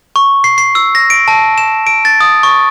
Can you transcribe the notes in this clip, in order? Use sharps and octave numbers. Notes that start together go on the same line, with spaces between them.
C#6
C7
C7
E6
A#6
D7
A5
E7
D7
A6
D#6
C#6